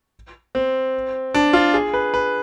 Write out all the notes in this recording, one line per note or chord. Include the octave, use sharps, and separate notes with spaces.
C4
D4
F4
G#4
B4
B4